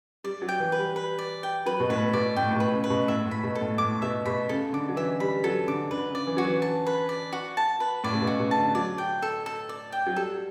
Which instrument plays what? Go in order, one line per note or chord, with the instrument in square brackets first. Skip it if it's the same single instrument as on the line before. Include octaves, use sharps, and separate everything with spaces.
[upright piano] G3 [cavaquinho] D5
[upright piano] F#3
[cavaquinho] G5
[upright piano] E3
[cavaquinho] B4
[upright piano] G3
[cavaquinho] B4
D5
G5
[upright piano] F#3 [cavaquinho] B4
[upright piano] B2
[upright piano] A2 [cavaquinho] B4
[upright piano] B2 [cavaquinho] D5
[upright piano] A2 [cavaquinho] G5
[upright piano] A2
B2
[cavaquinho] B4
[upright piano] C#3
[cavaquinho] B4
[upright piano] B2
[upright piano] A2 [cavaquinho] E5
[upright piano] A2
[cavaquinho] B5
[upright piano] B2
[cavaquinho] A4
[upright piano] A2
[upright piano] A2 [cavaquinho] D6
[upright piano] B2 [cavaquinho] E5
[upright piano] B2 [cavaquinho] B5
[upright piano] C#3 [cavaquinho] A4
[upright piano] D3 [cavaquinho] D6
[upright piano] F#3
[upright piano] E3 [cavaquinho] E5
[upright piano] G3 [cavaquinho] B5
[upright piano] F#3 [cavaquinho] A4
[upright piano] D3 [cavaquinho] D6
[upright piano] D3 [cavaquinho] B4
[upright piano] C#3
[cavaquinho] D5
[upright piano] E3
[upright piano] F#3 [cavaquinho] F#4
[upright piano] E3
[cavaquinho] A5
B4
D5
F#4
A5
B4
[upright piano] A2 [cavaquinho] D5
[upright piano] C#3
B2
[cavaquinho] F#4
[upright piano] B2
[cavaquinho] A5
[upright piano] D3
[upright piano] F#3 [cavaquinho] D5
[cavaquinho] G5
A4
A4
D5
G5
[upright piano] F#3
[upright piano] G3 [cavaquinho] A4